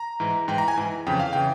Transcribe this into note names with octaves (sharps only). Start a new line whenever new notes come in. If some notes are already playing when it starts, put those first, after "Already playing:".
Already playing: A#5
G#2 E3
G#2 E3 G5
A#5
G#5
G#2 E3
F2 C#3 E3 G5
F5
C#3 E3 G5